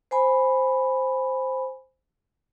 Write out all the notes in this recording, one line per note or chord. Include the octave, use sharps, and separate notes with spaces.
C5 G#5 B5